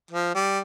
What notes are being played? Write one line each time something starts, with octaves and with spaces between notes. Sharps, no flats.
F3
G3